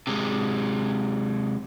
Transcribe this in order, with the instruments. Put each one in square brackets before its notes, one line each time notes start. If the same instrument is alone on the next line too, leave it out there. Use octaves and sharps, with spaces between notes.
[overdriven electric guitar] C3 G#3